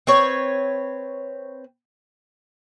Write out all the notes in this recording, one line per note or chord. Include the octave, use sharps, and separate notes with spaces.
C4 B4 C#5